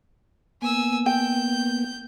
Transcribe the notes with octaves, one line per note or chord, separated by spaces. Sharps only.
A#3 B3 G#5 E6
G5 G6